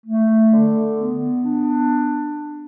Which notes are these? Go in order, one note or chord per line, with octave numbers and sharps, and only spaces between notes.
A3
D3
B3
D4